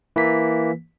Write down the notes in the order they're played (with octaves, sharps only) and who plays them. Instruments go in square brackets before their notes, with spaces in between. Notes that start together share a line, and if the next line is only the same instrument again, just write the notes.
[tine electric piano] E3 A#3 B6